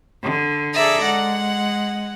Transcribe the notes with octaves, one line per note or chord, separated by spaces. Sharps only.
D3
G#4 A4 D5 E5 A#5
G#3 F#5